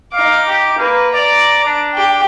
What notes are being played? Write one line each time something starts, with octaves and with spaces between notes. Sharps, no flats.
D#4 F5 D6
G4
A#3 B4
D5 A#5 D6
D4
G4 G5